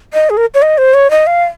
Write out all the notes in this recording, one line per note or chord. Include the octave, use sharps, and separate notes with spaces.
D#5
G#4
A#4
C#5
D#5
C5
C#5
D#5
F5